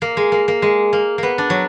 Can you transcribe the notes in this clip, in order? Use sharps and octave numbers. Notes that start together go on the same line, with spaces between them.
A#3
G#3
A#3
A#3
G#3
A#3
A#3 B3
D4
F#3